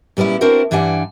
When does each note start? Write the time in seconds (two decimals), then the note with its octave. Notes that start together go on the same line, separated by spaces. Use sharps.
0.17 A#2 G3 B3 C#4 E4
0.41 C4 D4 E4 F#4 A#4 C5
0.71 G2 E3 G3 D4 F#5 G#5